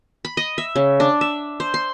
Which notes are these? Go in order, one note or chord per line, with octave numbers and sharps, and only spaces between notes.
B5
D#5
E5
C#3
D4
E5
C5
C6